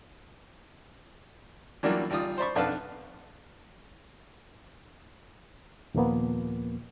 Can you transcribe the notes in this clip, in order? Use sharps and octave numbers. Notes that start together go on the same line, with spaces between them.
E3 F#3 G3 A#3 D4 F4
G#1 G3 F4 D#6
C5 D5 B5 C#6
B1 F2 D4 B4 F5 A5
D#2 A#2 F3 A#3 B3